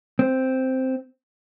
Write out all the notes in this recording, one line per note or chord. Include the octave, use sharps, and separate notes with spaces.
C4